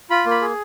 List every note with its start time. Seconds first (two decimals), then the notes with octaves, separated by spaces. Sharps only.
0.10 F4 B5
0.26 A#3
0.31 B5
0.41 G#4